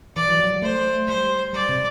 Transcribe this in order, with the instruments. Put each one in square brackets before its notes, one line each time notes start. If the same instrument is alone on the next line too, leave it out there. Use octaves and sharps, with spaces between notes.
[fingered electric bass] E3 [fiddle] D5
[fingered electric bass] F#3
F#3
F#3
[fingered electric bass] A3 [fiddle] C5
[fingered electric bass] G3 [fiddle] C5
[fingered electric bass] G3 [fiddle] D5
[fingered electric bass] C3